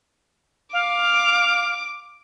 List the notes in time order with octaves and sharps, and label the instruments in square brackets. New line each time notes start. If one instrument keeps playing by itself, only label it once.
[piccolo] F5 [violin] D6